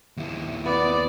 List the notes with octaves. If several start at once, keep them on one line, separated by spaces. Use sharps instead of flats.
D#2 E4
B3 D5